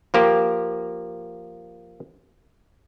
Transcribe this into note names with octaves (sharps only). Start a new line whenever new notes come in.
F3 A#3 G4